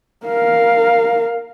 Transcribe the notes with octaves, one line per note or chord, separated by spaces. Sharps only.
A#4 F5